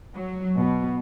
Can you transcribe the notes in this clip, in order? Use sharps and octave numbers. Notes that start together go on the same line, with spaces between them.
F#3
B2